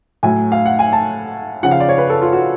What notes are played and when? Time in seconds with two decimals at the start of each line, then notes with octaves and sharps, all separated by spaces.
0.23 A2 F#3 G#5
0.52 F5
0.66 F#5
0.79 G#5
0.93 A5
1.63 C#3 F3 F#5
1.71 F5
1.80 D5
1.89 C#5
1.98 B4
2.10 A4
2.22 F4
2.33 F#4